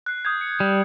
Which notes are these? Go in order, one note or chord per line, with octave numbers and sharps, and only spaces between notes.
F#6 C7
D#6 G6 G#6
C#7
G3